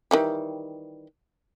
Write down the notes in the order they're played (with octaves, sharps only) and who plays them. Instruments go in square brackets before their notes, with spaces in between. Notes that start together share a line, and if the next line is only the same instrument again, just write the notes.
[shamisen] D#3 E3 G3